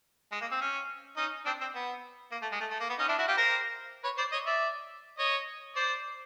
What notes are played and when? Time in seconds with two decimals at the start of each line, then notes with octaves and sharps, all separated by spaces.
0.32 G#3
0.41 A#3
0.51 C4
0.61 C#4
1.17 C#4 D#4
1.46 C4 D4
1.61 C4
1.75 B3
2.32 A#3
2.42 A3
2.52 G#3
2.60 A3
2.70 A3
2.80 A#3
2.89 B3
2.99 C#4 D#4
3.08 D4 E4
3.18 E4 F#4
3.27 F4 G4
3.37 A#4 C5
4.03 B4 C#5
4.18 C5 D5
4.32 C#5 D#5
4.46 D5 E5
5.18 C#5 D#5
5.75 C5 D5